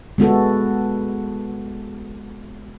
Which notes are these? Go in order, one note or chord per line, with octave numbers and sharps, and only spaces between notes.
G#3 B3 F#4 A4